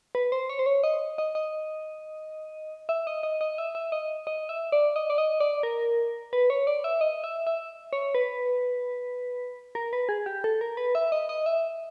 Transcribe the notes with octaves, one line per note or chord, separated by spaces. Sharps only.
B4
C5
C#5
C5
C#5
D#5
D#5
D#5
E5
D#5
D#5
D#5
E5
E5
D#5
D#5
E5
D5
D#5
D5
D#5
D5
A#4
B4
C#5
D5
E5
D#5
E5
E5
C#5
B4
A#4
B4
G#4
G4
A4
A#4
B4
E5
D#5
D#5
E5